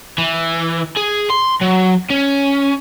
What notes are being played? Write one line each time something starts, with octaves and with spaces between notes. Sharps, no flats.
E3
G#4
C6
F#3
C#4